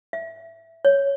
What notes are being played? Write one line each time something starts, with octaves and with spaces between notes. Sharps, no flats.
E5
C#5